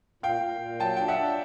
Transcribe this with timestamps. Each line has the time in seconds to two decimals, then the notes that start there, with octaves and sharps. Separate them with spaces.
0.23 A#2 F5 G5
0.42 A#2
0.61 A#2
0.80 F#3 G5 A5
0.97 D4 G5
1.08 E5 F#5
1.18 D4